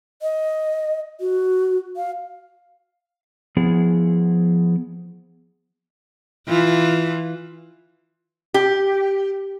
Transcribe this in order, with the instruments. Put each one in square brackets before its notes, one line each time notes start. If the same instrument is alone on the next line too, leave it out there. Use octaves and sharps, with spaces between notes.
[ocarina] D#5
F#4
F5
[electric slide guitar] F3 B3 E4 G#4
[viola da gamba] E3 F4
[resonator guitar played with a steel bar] G4